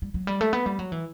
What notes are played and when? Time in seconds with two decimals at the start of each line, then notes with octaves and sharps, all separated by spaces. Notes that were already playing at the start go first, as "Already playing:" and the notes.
0.02 G3
0.14 F#3
0.27 G3
0.41 A3
0.53 B3
0.66 G3
0.79 F#3
0.92 E3